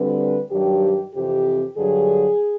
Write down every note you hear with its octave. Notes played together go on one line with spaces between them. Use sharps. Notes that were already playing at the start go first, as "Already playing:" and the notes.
Already playing: D2 D3 G3 C4 B4
G2 D#3 F#3 G4
F2 C3 E3 G4
G2 D3 F#3 G#4